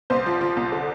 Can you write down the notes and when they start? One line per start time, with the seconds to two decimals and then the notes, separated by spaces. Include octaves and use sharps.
0.10 C2 C5
0.26 F3
0.41 F3
0.56 C2
0.72 D3